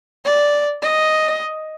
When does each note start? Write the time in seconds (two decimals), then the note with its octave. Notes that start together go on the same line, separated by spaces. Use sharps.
0.25 D5
0.82 D#5